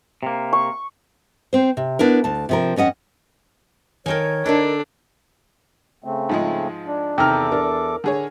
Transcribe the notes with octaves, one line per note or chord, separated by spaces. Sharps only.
C3 A#3
C#6
C4 C5
C3
B3 D4 E4 A#4
D2 A5
C3 F3 A#4
F2 C#4 D#5 F#5
D#3 A4 A#4 C#5 G5 G#5
D3 D4 D#4 A4 A#4
C#3 A3 C4
G#2 F3 G#3
D4
E2 C3 D#3 A4 G5 A#5 D6 F6
D4 A#4
D3 G#4 C#5